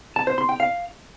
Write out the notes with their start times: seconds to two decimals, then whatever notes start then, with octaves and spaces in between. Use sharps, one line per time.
0.16 A5
0.27 C5
0.38 C6
0.49 G5
0.60 F5